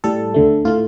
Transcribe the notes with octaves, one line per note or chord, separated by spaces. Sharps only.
A2 G3 A4
D2 D3 A3
A2 A3 F4